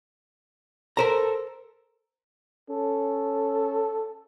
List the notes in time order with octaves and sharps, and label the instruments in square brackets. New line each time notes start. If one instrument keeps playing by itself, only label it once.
[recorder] A4 [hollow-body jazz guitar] A#4 C5 A#5
[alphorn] C#4 [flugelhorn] A4